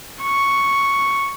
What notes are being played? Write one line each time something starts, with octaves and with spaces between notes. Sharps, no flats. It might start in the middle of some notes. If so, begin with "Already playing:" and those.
C#6